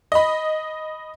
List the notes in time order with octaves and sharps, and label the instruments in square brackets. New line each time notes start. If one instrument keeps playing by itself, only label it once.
[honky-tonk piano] D#5 B5